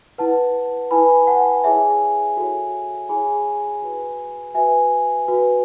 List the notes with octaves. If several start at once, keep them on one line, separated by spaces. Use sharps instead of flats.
E4 B4 F#5 A5
E4 B4 G#5 B5
F#5 A5
E4 G#4 C#5 E5 G#5
F#4 A4 C#5
E4 G#4 C#5 G#5 B5
F#4 B4
F#4 B4 E5 G#5
F#4 B4